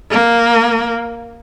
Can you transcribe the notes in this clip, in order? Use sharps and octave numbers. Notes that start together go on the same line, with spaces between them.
A#3